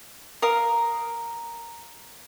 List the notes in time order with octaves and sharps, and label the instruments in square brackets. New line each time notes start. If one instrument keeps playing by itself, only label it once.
[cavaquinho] A#4 F5 D#6